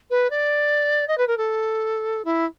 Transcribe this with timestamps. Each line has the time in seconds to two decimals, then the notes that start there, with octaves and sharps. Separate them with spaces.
0.10 B4
0.30 D5
1.08 D#5
1.18 B4
1.27 A#4
1.37 A4
2.25 E4